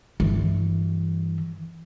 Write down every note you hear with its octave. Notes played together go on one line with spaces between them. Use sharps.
G2 E3